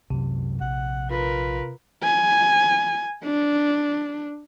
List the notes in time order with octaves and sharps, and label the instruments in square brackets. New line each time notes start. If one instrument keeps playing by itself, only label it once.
[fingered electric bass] C2 F#2 F#3 [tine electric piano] C3
[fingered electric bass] A#1 [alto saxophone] F#5
[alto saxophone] F4 [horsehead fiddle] A#4 B4
[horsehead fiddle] G#5
D4